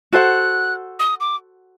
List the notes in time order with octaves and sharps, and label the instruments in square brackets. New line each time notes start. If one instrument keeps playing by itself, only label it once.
[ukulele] F#4 A4 C5 F#5 [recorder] F#6
[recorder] D#6
D6